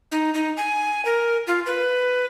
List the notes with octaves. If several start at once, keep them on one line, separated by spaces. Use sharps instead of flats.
D#4
D#4
G#5
A#4
F4
B4